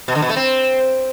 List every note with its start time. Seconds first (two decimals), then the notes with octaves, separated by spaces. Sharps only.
0.08 B2
0.15 D3
0.22 B2
0.29 A3
0.36 C4